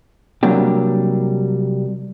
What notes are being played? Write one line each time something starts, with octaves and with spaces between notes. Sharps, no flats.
C3 F#3 G3 A#3 D4 G4